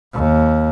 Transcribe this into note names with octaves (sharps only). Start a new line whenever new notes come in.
D#2